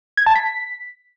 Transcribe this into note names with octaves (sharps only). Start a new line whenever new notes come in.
G#6
A5
B6